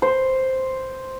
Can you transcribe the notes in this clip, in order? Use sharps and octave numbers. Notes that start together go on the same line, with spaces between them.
C5